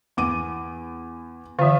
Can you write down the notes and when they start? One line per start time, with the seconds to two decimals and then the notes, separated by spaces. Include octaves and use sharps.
0.17 E2 D6 D#7
1.59 D3 E3 F4 E5